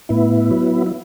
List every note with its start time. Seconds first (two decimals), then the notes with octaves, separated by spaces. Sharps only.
0.09 A2 B3 E4
0.51 F#3
0.86 E4